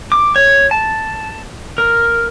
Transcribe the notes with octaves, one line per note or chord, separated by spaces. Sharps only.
D6
C#5
A5
A#4